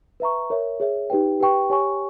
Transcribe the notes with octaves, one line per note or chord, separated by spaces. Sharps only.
B4 E5 A#5 C#6
A#4 C#5 E5
G#4 C#5 E5
D#4 G4 B4 G5
G4 B4 G5 C#6
G4 C#5 G#5 C#6